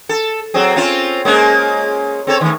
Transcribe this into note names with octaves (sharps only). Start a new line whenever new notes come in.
A4
F#3 C4 G#4
C4 C#4 F4
G#3 A#3 C#4
C4 A4 C#5
D#3 A3